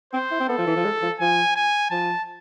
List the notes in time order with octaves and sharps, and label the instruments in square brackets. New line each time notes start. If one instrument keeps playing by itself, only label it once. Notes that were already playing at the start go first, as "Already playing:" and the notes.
[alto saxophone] C4 [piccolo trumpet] C5
[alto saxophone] E4
C4
[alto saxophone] B3 [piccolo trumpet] A4
[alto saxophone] F3
E3
F3
G#3
F3
[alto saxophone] F3 [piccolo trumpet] G#5
[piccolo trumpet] G#5
[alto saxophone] F3 [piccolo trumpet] A5